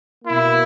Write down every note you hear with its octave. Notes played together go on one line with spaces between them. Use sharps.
B2 A#3 E4